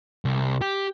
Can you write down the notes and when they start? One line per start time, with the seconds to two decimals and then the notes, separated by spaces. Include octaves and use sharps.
0.25 C2
0.61 G4